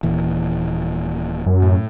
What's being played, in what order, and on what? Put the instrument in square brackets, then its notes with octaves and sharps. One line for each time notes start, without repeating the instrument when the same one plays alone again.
[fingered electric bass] D#1 A#2 E3
[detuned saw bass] F#2
[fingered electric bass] A2